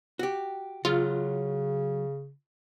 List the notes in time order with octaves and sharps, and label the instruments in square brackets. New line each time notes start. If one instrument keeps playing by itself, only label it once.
[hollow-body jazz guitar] F#4 G4
[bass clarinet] C#3 [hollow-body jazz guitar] F#3 [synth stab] F4